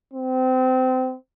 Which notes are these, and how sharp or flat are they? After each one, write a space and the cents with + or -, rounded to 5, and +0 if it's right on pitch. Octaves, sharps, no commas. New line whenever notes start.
C4 -25